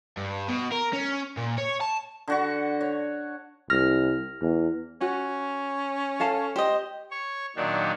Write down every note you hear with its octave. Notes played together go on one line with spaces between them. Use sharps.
G2
B2
A#4
C#4
A#2
C#5
A5
D3 F#4 C#6
C#5
C2 F6 A#6
E2
C#4 F#4
A4 F5 A5
G4 C5 D#5
C#5 C#6
A#2 D#3 F#3 D4 D#4